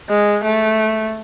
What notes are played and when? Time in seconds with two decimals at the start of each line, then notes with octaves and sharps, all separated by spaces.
0.09 G#3
0.44 A3